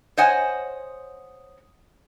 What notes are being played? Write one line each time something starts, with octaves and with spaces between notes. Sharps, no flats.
C5 C#5 D#5 F#5 G#5